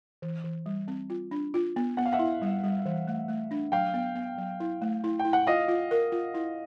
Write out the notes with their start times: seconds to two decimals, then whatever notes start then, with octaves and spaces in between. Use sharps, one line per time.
0.22 E3
0.44 E3
0.66 G3
0.88 C4
1.10 F4
1.31 D4
1.54 F4
1.76 B3
1.97 B3 F#5
2.06 F5
2.13 E5 F#5
2.19 E4
2.42 G3
2.64 G3
2.86 E3
3.07 A3
3.28 A3
3.51 D4
3.72 F#3 F5 G5
3.94 B3
4.15 B3
4.38 F#3
4.60 E4
4.82 A3
5.04 E4
5.19 G5
5.25 E4
5.33 F#5
5.47 F4 D#5 F5
5.68 F4
5.91 A#4
6.12 F4
6.34 E4